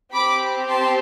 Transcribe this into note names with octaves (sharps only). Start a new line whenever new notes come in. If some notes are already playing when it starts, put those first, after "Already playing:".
C4 G4 B5 D6
A5 C6